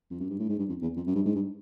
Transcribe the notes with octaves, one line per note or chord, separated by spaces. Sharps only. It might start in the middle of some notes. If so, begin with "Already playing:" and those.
F2
F#2
G2
A2
G#2
G2
F2
E2
F2
F#2
G2
G#2
G2